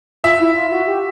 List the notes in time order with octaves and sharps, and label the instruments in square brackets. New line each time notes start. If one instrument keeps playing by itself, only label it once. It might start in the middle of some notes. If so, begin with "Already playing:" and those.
[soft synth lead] F4 [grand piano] E5
[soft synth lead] E4
F4
F#4
G4